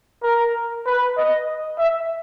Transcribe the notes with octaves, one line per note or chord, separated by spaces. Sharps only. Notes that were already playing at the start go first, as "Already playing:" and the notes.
A#4
B4
D#5
E5